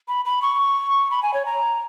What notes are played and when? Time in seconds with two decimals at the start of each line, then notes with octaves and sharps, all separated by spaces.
0.08 B5
0.25 B5
0.42 C#6
1.11 B5
1.23 G#5
1.34 C#5
1.45 A#5